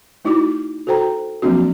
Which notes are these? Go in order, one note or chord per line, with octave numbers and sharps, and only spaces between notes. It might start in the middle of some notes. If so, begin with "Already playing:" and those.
A3 D#4 E4 F#4 D6
F#4 A4 C5 G5 A#5
F3 F#3 A#3 C4 D4 F#4